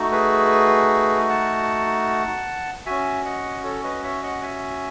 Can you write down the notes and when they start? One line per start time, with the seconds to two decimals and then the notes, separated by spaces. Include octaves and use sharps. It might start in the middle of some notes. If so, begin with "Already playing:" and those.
Already playing: A3 D#4 F#4
0.12 G#4 B4
1.29 F#5 A5
2.86 C#4 F#4 E5 G#5
3.25 D#5 F#5
3.64 A4 C#5
3.83 B4 D#5
4.03 C#5 E5
4.23 D#5 F#5
4.42 E5 G#5